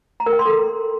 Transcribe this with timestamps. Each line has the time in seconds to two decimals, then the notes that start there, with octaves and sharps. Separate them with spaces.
0.20 A#5
0.26 A#4
0.33 G5
0.39 C6
0.46 A4